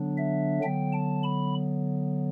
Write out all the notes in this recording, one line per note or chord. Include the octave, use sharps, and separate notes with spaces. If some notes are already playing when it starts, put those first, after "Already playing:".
Already playing: D3 F#3 B3 D4
E5
D3 F#3 B3 G5
A5
B5